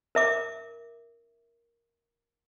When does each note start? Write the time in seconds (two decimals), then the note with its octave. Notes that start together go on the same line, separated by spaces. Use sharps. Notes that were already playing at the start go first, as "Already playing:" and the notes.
0.15 A#4 E5 D6